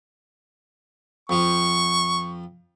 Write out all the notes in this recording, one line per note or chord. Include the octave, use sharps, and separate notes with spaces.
F2 F3 C#6